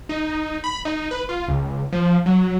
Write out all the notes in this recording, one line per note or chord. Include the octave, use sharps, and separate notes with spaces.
D#4
B5
D#4
B4
F4
C#2
F3
F#3